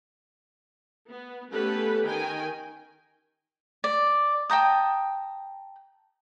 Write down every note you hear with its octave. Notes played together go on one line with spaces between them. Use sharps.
B3
A3 B3 C#4 G4 A4 B4
D#3 G5 G#5
D5
G5 A5 A#5 D#6